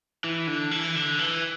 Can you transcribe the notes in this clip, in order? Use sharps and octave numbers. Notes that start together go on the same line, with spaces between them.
E3
D3
E3
D3
E3